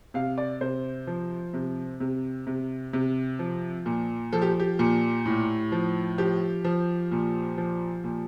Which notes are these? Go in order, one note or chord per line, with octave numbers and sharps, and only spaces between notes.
C3 F5
D5
C3 C5
F3
C3
C3
C3
C3
F3
A#2
F3 A4
G4
G4
A#2
A2
F3
F3 G4
F3
A#2
F3
A#2